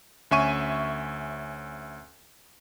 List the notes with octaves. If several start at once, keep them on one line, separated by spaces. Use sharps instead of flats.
D2 C#4 E5 G#5 C#6 D#7